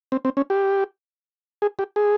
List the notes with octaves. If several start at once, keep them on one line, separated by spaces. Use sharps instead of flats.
C4
C4
C#4
G4
G#4
G4
G#4